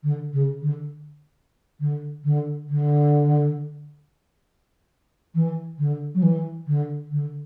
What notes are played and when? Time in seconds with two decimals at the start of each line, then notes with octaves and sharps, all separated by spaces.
0.03 D3
0.33 C#3
0.62 D3
1.80 D3
2.24 D3
2.69 D3
5.35 E3
5.78 D3
6.15 F#3
6.22 E3
6.67 D3
7.12 D3